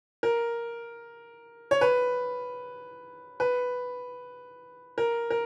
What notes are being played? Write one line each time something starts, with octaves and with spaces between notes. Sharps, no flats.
A#4
C#5
B4
B4
A#4
A#4